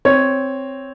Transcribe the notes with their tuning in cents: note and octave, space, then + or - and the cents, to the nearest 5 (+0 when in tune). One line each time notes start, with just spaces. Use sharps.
C4 +0 C#5 +0